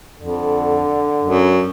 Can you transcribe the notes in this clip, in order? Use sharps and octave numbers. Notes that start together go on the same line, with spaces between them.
F2 D3
F#2